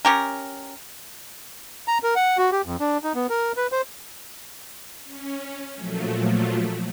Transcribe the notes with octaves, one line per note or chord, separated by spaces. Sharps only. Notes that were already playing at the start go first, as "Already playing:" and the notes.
C#4 G4 A#4
A#5
A#4
F#5
F#4
G4
F2
D4
D#4
B3
A#4
B4
C5
C#4
A#2 F3 F#3 A3